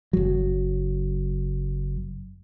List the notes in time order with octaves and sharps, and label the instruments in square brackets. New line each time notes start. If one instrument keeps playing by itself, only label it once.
[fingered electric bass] F#1 F#3